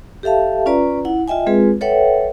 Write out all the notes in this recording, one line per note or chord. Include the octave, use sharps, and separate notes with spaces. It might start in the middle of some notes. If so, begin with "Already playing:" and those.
G4 A4 E5 F5 A5
C#4 F4 B4 D5 A#5
E4 F#5
F4 D#5 E5 G5 G#5
G#3 C4 F4 G#4 B4
A4 B4 C#5 E5 F#5 G5